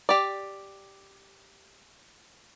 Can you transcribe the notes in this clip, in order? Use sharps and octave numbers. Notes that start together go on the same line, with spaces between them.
G4 D5